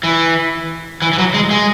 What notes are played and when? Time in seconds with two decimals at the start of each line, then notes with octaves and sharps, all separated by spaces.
0.03 E3
1.02 E3
1.13 E3
1.18 F#3
1.34 G#3
1.51 G#3